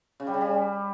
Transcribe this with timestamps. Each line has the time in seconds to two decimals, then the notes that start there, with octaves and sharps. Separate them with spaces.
0.20 C#3
0.27 G3
0.34 C#3
0.41 G3